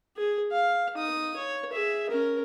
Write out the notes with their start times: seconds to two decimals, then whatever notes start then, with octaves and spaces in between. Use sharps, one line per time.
0.17 G#4
0.52 F5
0.95 D#4 D#6
1.36 C#5
1.72 G#4 E5
2.09 C#4 A#4